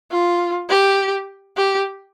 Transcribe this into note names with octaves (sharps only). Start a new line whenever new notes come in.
F4
G4
G4